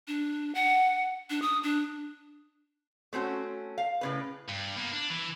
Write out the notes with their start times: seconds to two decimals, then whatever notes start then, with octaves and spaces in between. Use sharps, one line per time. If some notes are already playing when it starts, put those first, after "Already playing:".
0.08 D4
0.55 F#5
1.30 D4
1.42 D#6
1.63 D4
3.13 A3 C4 C#4 F#4
3.78 F5
4.01 A2 C#3 B4
4.49 G2
4.76 A#3 B3
4.92 D4
5.10 E3